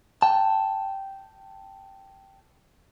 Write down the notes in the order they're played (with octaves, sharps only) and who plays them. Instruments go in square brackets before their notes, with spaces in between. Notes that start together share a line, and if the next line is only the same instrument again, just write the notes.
[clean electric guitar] G5 A5